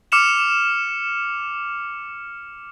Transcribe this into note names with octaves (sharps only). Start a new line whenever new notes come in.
D6 F6 C#7 E7 F7